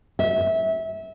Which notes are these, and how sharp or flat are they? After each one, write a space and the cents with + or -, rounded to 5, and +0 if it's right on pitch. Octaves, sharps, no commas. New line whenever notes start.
E5 -25